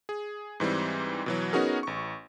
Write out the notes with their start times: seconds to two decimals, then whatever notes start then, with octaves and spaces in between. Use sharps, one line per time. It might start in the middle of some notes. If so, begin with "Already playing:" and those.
0.09 G#4
0.60 G#2 E3 G3 C4
1.26 B2 E3 F#3
1.53 B3 C#4 D#4 F#4 G#4 A#4
1.83 A1 C#6